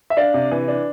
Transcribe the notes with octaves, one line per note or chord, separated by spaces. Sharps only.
E5
D4 D5 F5
C3
E3
D4